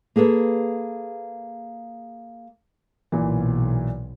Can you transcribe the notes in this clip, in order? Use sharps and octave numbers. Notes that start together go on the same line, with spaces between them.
A#3 G#4 A4 B4
B1 A#2 E3